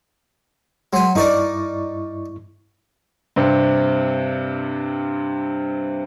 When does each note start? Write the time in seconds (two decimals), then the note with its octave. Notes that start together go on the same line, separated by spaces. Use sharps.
0.93 F#3 G#3 G#5 C6
1.15 G2 D#4 E4 A#4 D5 C#6
3.36 G2 C3 C4